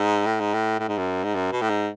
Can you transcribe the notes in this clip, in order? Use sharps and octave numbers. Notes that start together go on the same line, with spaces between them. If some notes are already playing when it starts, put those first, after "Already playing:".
Already playing: G#2
A2
G#2
A2
A2
G#2
F#2
G#2
F#2
B2
A2
G#2